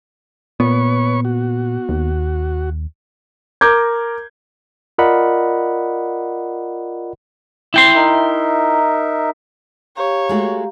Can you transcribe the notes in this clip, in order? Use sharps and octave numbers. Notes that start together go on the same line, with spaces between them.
A#2 B3 B4 C#5 C#6
F#4
D#2
A#4 A#5 D6 G6 G#6
F4 A#4 D5 D#5 F#5 B5
E4 G5 C6
D#4 A#4 E5
G4 C#5 F5 A#5
G#3 A3 F#4